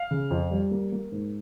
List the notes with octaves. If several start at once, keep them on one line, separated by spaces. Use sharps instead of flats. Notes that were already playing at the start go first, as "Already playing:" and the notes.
Already playing: F5
C#3
F2
G3
A#3
A#3
G#2